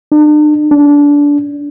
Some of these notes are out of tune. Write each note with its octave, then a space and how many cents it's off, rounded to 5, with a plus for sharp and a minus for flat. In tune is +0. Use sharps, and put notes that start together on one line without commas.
D4 +45
D4 -20